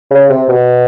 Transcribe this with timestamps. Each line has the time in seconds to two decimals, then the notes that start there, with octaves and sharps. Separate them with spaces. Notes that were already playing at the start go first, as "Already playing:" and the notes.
0.11 C#3
0.29 C3
0.49 B2